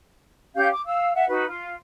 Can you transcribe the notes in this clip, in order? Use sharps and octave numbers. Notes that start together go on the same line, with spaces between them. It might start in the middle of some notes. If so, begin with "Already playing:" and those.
C#4 G4 F5 G6
D6
F5 E6
E5 F#5
D#4 F#4 B4
F4